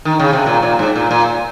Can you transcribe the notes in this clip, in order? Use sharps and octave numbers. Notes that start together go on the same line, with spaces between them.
D#3
C#3
C3
A#2
A#2
G#2
A#2
A#2